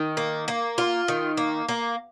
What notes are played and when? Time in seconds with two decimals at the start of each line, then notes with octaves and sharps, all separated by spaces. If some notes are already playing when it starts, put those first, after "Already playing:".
Already playing: D#3
0.17 A#3
0.48 A#3
0.78 F4
1.08 D#3
1.37 A#3
1.69 A#3